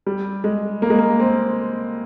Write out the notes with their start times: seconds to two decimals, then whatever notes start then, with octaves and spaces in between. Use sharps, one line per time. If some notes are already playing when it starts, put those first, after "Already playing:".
0.06 G3
0.44 G#3
0.82 A#3
0.90 G#3
0.99 A#3
1.20 C4